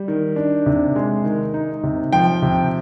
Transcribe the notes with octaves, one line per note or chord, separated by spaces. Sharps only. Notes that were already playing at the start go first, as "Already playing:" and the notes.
Already playing: G3
D#3
D4
C3
G#3
D#3
D#4
C3
F3 G5
C3